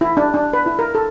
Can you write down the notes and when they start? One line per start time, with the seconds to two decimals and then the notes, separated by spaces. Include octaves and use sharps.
0.01 E4
0.17 D4
0.34 D4
0.53 B4
0.66 E4
0.79 A#4
0.95 A4